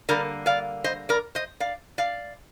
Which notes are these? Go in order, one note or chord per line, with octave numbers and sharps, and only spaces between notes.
D3 G3 A#3 A#4 D5
D5 F5
C5 D#5
A#4 D5
C5 D#5
D5 F5
D5 F5